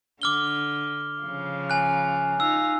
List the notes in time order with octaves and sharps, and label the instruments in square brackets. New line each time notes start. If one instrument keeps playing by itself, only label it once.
[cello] D3 [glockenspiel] D6 F6 G7
[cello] C#3 F3
[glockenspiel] G#5 F#6
[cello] D#4 F4 [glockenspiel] E6